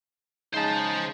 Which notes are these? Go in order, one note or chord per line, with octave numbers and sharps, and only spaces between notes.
C#3 G#3 D#4 C5 A5